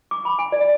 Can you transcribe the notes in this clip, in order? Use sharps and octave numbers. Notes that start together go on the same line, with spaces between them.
D6
B5
G#5
D5